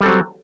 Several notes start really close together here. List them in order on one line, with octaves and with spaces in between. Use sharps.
G3 A4 C4 F#3